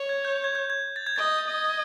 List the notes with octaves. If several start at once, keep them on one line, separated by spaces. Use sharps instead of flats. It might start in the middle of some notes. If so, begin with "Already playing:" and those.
Already playing: C#5
G#6
G6
G#6
G6
G#6
A6
G#6
D#5 A6
D#5